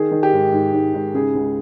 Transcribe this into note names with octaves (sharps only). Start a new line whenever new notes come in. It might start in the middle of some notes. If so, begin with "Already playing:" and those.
Already playing: D#3 G#4
D#3
G4
G#2
G#2
G#2
G#2
C#3 G#4
C#2